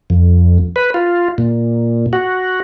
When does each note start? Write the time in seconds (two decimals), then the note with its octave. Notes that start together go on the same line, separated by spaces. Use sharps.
0.10 F2
0.76 B4
0.94 F4
1.38 A#2
2.13 F#4